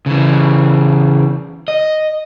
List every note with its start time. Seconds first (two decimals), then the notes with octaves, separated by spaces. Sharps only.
0.06 C#3 E3
1.68 D#5